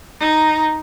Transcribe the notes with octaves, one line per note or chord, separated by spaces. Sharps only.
D#4 A#5